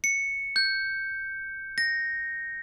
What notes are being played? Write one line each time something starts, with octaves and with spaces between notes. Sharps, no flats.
C#7
G6
A#6